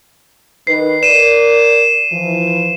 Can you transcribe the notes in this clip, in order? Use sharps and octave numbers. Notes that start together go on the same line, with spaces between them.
D#3 B4 C7
A#4 D5 D#7 E7
E3 F3